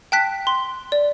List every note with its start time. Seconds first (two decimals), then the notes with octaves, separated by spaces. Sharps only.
0.12 G5 A5 F#6 B6
0.47 C6
0.92 D5